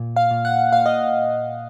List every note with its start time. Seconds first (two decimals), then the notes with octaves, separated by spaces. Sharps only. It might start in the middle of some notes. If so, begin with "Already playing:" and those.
Already playing: A#2
0.16 F5
0.31 A#2
0.45 F#5
0.72 A#2 F5
0.86 D#5